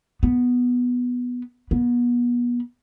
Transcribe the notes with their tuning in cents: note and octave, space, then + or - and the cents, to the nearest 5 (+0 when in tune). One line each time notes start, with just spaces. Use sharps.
B3 -5
B3 -35